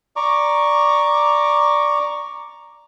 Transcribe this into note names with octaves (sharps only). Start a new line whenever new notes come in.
D5 A#5 C#6 D6